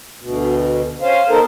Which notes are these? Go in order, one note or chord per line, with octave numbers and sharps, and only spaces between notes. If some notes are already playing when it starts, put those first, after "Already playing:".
D2 B2
C#4 C5 F5
B3 D#4 A4 A#4 C5